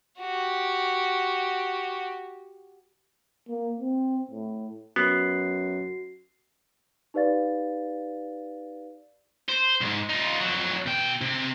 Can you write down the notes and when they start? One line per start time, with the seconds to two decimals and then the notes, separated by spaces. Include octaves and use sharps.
0.20 F#4 G4
3.49 A#3
3.80 C4
4.30 A2
4.96 F#2 B3 F#4 C7
7.14 D#4 G4 B4 D5 F5 A6
9.49 C5
9.81 C2 G#2
10.09 D#4 F4
10.40 F2 F#3
10.86 B2 G5
11.21 C3 C4